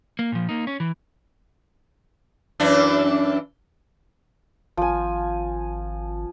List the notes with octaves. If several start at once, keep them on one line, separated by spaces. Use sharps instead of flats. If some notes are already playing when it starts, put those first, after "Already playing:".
A#3
A#2 F3
A#3 D#4
C#4
E3
F#2 E3 D4
G#1 F3 G#5